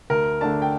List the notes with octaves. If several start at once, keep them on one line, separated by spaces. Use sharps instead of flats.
D2 A#4
D3 A3 D4 A5
G5